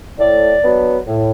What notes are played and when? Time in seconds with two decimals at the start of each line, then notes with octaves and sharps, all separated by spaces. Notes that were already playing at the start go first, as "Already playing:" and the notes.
0.19 A2 D5
0.63 F#3 B3 D4
1.07 A2